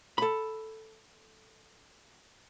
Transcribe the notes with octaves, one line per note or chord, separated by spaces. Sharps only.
A4 B5